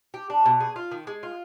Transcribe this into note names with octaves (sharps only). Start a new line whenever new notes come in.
G4
D4
B2
G#4
F4
D#3
G#3
F4